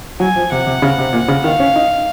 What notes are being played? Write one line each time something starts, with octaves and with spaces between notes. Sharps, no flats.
F#3 G#5
F3
C3 F#5
C3
C#3
C3
A#2
C#3
D#3 F5
C#4
D#4